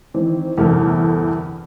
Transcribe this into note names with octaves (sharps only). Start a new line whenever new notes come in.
D#3 E3 C4
G1 E2 C3 A3 A#4 F6